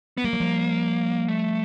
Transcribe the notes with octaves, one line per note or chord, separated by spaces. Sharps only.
B3
G3 A#3
F#3
F3 G3
A3